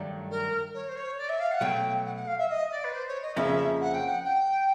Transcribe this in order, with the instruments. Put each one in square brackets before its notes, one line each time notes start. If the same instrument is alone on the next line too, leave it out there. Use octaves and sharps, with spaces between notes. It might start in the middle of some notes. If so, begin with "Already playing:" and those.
Already playing: [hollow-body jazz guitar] G2 D#3 F#3 A3 D4
[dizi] A#4
C#5
C5
C#5
D5
E5
F5
F#5
[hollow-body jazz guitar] B2 F#3 A3 [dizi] G5
[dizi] F#5
F#5
F5
E5
D#5
D5
B4
C5
C#5
D#5
[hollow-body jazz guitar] F2 C#3 F3 A#3 C#4 [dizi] E5
[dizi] F#5
G5
F#5
G5